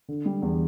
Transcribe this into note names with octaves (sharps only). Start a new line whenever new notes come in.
D3
G3
E2